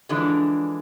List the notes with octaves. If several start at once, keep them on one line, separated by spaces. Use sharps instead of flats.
D3 E3 F3 G#3 D4